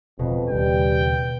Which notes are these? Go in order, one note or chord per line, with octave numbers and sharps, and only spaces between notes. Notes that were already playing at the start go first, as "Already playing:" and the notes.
E1 F2 B2
D#2 C#3 G3 G5